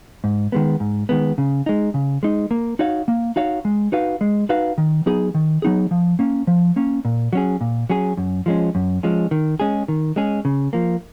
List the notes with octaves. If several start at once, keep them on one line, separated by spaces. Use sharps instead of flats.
G#2
D#3 G#3 B3
G#2
D#3 G#3 B3
C#3
G#3 D#4
C#3
G#3 D#4
A#3
D#4 F#4 C#5 F5
A#3
D#4 F#4 C#5 F5
G#3
D#4 F#4 B4 F5
G#3
D#4 F#4 B4 F5
D#3
F#3 B3 D#4 G#4
D#3
F#3 B3 D#4 G#4
F3
A#3 C#4
F3
A#3 C#4
A#2
F#3 C#4 G#4
A#2
F#3 C#4 G#4
F#2
F3 G#3 C#4
F#2
F3 G#3 C#4
D#3
G#3 C#4 G#4
D#3
G#3 C#4 G#4
C#3
F3 A#3